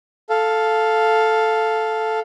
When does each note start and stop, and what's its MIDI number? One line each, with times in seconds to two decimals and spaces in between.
0.30 2.20 69
0.30 2.20 77